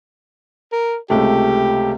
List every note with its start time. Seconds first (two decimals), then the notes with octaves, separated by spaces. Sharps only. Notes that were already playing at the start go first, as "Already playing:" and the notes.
0.72 A#4
1.10 C#2 C3 A3 G4